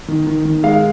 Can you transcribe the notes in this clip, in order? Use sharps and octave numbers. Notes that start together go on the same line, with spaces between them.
D#3
D#3
D#3
G#3 F5